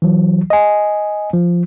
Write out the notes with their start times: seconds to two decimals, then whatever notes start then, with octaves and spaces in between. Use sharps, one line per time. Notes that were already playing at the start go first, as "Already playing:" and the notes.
0.02 E3 F#3
0.50 D#5 G#5
1.33 F3